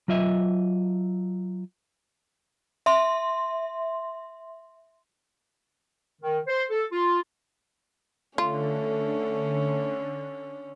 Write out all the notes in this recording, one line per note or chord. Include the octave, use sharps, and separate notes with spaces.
F#3 F4 D#5 E5
E5 C6
D#3
C5
A4
F4
D3 A3 C#4 F4